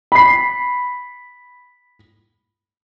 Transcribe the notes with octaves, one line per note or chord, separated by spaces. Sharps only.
B5 C7